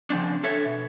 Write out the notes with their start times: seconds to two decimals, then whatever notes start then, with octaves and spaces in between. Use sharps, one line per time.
0.10 C#3 F3 C4 D4
0.44 D4 A4 C#5 E5
0.66 B2